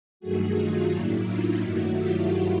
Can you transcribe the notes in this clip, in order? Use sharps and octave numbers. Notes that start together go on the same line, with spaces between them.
G2 D#3 F#3 A3 F#4 G#4
D#4 F4
A2 F#3 A#3 D4 E4
D#4 F4
G2 D#3 F#3 A3 E4 F#4
F4 G4